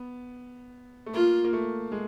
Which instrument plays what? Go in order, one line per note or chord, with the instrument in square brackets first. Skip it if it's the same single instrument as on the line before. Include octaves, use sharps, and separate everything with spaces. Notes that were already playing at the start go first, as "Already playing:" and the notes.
Already playing: [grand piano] B3
A3
[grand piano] A#3 [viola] F4
[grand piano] A#3
A3
G#3